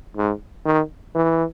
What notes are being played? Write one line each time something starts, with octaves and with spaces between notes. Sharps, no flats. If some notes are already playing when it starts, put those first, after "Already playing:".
G#2
D#3
E3